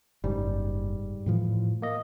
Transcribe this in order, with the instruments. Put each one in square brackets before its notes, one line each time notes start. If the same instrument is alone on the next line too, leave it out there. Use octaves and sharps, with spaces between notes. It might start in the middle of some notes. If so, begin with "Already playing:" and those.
[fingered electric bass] F#1 [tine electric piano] G#2 G3
[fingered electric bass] A2 E3 F3
[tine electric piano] A#3 D#5